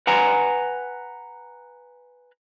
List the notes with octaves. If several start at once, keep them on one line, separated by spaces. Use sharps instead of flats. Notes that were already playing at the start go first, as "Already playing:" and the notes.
B4 F#5 G#5 A#5